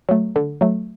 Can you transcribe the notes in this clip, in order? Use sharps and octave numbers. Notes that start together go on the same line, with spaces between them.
F#3 A3
D3
F#3 A3